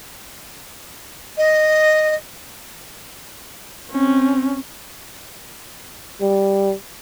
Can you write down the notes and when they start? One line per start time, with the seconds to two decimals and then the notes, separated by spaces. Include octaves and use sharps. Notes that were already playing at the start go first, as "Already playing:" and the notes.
1.37 D#5
3.91 C4 C#4
6.21 G3